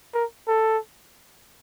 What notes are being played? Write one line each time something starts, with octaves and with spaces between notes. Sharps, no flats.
A#4
A4